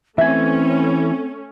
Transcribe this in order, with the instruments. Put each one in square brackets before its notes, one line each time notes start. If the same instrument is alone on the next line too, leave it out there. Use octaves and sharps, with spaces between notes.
[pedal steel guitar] E3 G#5 [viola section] A3 C#4 [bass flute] C4 [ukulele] E5